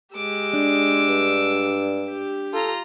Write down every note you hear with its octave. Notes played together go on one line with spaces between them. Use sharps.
G#3 G4 D6 E6
D4
G2
G4
F4 A4 A#5